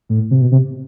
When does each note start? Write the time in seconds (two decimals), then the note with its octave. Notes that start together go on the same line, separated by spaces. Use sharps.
0.09 A2
0.31 C3
0.41 B2
0.52 C3